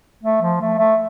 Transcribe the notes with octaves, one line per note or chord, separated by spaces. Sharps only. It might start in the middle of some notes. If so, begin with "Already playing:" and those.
A3
F3
A3
A3